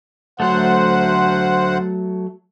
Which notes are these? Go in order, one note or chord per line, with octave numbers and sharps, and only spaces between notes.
D2 F#3 A3 C5 F#5